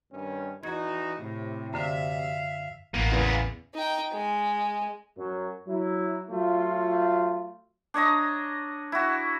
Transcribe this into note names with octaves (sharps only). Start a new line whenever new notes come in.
G2 D#3 C#4
E2 D#4 F#4 G#6
A2 C3
F#2 D3 E5 F5
A1 A#3 B3 D#7
E2 C#3 E3
D#4 G5
G#3
F#2 F#3
F#3 E4
F#3 A3 F4
D4 C#5 D#5 A#5
E4 F#4